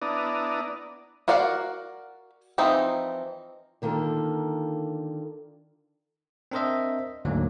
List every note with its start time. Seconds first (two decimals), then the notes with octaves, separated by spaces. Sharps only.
0.02 B3 D4 E4 D5 A#5 D#6
1.28 F#4 A#4 D5 F5 F#5
2.58 E3 F3 C4 D#4
3.82 D3 D#3 A#3 F4 A4
6.51 C4 D4 A#4 C5 D#5 E5
7.25 D2 G#2 D3 F#3 A#3